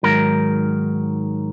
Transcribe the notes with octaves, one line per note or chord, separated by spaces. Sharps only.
G#2 D#3 F#3 A#4